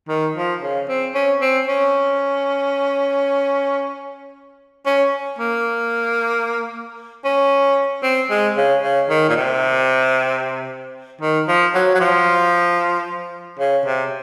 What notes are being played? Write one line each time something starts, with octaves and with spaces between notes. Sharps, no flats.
D#3
F3
C#3
C4
C#4
C4
C#4
C#4
A#3
C#4
C4
G#3
C#3
C#3
D#3
A#2
C3
D#3
F3
F#3
F#3
F3
C#3
C3